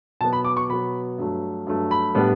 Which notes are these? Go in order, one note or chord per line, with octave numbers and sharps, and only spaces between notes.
B2 F#3 B3 A5
B5
D6
C#6
B2 F#3 B3 B5
G2 F#3 A3
G2 F#3 A3
B5
A2 G3 B3 D4